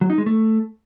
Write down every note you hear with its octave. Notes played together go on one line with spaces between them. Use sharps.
F#3
D#4
G#3
A3